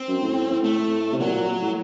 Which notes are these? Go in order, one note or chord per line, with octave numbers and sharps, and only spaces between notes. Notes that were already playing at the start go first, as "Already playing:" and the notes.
Already playing: C4
F#2
A2
A2
A2
A3
C3
A#2 F#3
A#2
A2